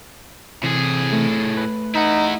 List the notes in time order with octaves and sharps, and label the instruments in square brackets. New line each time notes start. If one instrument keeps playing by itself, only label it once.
[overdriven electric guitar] A2 G#4 [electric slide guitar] C3 E3
[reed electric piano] A3
[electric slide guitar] B4
[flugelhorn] D#4 [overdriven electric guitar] E4 F#5